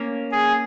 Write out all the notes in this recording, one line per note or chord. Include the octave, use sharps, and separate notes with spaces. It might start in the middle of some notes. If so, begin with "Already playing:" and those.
Already playing: A#3 C#4
G#4